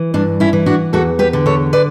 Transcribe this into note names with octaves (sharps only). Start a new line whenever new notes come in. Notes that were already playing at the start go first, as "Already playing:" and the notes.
Already playing: E3
G2 D4
C#4 E4
E3
D4 F#4
E2 F#4 A4
G4 B4
D3
A4 C#5
B4 D5